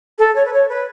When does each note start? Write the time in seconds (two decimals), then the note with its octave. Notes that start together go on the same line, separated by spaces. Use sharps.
0.18 A4
0.35 C#5
0.45 B4
0.53 C#5
0.69 B4